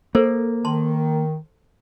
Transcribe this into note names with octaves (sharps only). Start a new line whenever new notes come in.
A#3 A4 A#4 C5
D#3 A5 C6